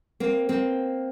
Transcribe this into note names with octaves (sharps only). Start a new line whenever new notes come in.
A#3 C4
A#3 C4